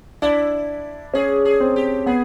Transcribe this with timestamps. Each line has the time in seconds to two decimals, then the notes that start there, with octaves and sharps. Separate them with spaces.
0.22 D4 E4
1.14 C#4 G#4
1.45 G#4
1.61 C4
1.76 G4
2.06 B3 G#4